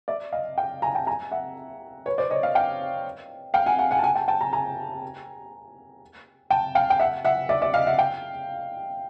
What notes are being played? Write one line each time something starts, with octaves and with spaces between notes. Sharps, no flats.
D5 E5
D#5 F5
F5 G5
G#5 A#5
G5 A5
G#5 A#5
E5 F#5
B4 C#5
C5 D5
C#5 D#5
D#5 F5
F5 G5
F5 G5
F#5 G#5
F#5 G#5
F#5 G#5
A5
F#5 G#5
G5 A5
G5 A5
G#5 A#5
G#5 A#5
G5 A5
F5 G5
G5
E5 F#5
E5 F#5
D5 E5
D5 E5
D#5 F5
E5 F#5
F5 G5